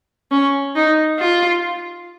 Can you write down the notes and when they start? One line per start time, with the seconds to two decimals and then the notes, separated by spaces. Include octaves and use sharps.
0.31 C#4
0.76 D#4
1.19 F4